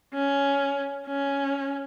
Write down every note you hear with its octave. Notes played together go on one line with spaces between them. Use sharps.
C#4
C#4